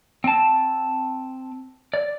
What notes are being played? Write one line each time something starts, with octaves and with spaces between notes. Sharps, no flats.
C4 A5
D5